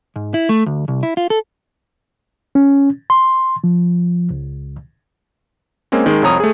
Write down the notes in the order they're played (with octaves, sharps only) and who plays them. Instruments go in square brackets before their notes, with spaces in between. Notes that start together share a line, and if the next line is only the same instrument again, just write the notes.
[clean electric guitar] G#2
E4
A3
D2
C2
E4
F4
A4
[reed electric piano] C#4
C6
F3
C#2
[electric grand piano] G#3 A#3 C4 C#4
D#3 G#3
C2 F2 C#5 A#5 D#6
A3 G#4